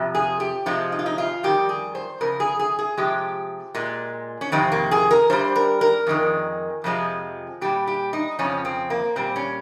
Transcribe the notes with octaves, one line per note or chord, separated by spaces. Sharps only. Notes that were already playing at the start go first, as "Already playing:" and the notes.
Already playing: F2 C3 F3
G#4
G4
C3 F3 G#3 F4
D#4
F4
D#4
F4
F2 D#3 G3 G4
G#4
C5
F2 C#3 A#4
G#4
G#4
G#4
C3 F3 G#3 G4
A#2 G#3
C#4
F2 C3 D#3 C4
A#3
G#4
A#4
G2 G3 C5
A#4
A#4
F2 D#3 G#3
F2 C3 F3 G#3
A#2 G3 G4
G4
D#4
F2 C#3 F3 C#4
C4
A#3
A#2 G3 C4
C#4